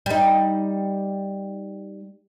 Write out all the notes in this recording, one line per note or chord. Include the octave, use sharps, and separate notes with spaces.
G3 D#4